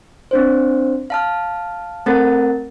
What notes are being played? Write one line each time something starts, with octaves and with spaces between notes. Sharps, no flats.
C4 D4 C5
F5 A5 F6
A3 C4 A4 A#4 F#5 A6